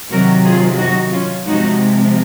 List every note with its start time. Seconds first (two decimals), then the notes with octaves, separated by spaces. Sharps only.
0.11 C3 D#3 F#3 F#4 A#4
0.44 F4 G#4
0.78 D#4 F#4
1.12 C#4 F4
1.46 C3 F3 G#3 D#4 F#4